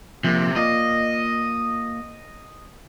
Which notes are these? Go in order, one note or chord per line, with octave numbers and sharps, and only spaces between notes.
C3 F3 A#3
A#3 F4 D5 D#5